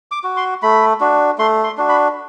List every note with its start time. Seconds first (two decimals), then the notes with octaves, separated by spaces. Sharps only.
0.11 D6
0.24 F#4
0.37 C6
0.63 A3 B5
1.01 D4 F#4
1.38 A3 C6
1.64 C6
1.78 D4 F#4
1.89 B5